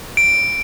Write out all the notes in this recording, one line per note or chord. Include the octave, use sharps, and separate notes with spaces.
D7